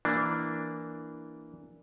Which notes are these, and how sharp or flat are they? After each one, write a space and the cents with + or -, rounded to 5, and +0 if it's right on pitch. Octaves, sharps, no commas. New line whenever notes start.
E3 +0 A#3 -5 D4 +0